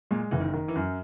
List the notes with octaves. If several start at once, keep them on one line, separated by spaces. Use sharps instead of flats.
A#2 G#3
F#1 E3
D#3
D#3
E3
F#2